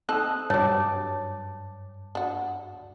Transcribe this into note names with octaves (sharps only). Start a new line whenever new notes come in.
C4 D#4 A4 D#6 E6 F#6
G2 F#3 G3 C#5 A5 D6
D4 F#4